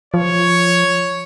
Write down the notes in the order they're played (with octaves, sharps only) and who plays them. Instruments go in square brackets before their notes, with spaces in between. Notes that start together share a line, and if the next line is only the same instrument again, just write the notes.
[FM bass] F3 [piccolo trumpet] C#5